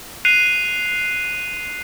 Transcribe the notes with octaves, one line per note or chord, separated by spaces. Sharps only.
F#6 C7 D#7 F7